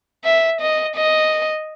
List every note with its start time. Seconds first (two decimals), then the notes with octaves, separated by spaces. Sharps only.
0.24 E5
0.61 D#5
0.96 D#5